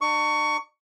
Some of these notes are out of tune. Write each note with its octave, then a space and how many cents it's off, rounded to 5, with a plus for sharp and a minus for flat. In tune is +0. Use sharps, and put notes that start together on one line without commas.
D4 +45 C#6 +15